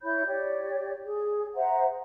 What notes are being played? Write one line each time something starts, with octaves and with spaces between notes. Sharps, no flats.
E4 C#5 B5 G6
G4 C#5 D5
G#4
C5 E5 F#5 A#5